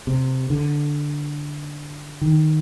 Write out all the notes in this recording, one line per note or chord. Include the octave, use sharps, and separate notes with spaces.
C3
D3
D#3